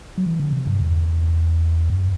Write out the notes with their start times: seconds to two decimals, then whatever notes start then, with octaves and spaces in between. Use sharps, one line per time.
0.18 F#3
0.26 E3
0.40 D3
0.53 C3
0.67 G2
0.80 E2
1.90 F#2